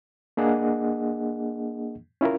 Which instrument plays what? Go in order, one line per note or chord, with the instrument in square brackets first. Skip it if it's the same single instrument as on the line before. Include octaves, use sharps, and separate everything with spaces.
[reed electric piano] A#3 D4 G#4 D#5 F#5
C#4 E4 F4 A#4